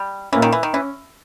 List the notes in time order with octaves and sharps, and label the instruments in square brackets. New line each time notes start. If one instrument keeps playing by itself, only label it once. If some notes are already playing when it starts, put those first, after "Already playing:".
Already playing: [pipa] G3
[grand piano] A#2 A#3 C#4 [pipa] E3
[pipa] D#3
E3
D#3
[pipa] E3 [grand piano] C#4